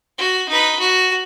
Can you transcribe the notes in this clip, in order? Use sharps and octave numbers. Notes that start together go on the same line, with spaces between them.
F#4
D#4 B4
F#4